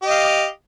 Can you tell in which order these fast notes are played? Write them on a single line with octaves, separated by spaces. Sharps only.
G4 D#5 F5